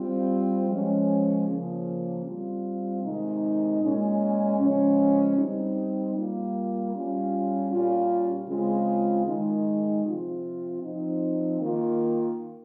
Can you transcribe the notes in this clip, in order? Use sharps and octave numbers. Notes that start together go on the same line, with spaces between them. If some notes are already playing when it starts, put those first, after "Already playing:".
Already playing: G3 C4 F4
F3 G#3 C#4
C#3 F3 A#3
G3 C4 F4
C3 D#3 G#3 D#4
A#2 G#3 C#4
C#3 F3 G#3 C#4
G3 C4 D#4
G3 A#3 F4
G3 C#4 F4
A#2 G3 C#4 F4
C#3 G#3 C4 F4
D#3 G#3 D#4
C3 F3 C4 F4
F3 C4 D#4
D#3 A#3 F4